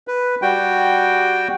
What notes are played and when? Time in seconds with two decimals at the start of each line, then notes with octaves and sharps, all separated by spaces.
0.08 B4
0.42 G3 F#4 G5